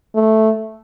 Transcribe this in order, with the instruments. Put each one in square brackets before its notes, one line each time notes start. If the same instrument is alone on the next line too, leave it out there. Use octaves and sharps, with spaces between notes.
[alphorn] A3